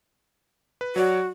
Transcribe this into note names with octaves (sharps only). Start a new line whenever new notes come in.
B4
F#3 F#4 C#5 D5